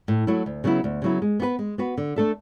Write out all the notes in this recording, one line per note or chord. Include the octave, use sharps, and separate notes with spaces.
A2
F#3 A3 E4
D2
C#3 F#3 B3 E4
D2
C#3 F#3 B3 E4
G#3
B3 F#4 B4
G#3
B3 F#4 B4
D3
A3 D4 A4 E5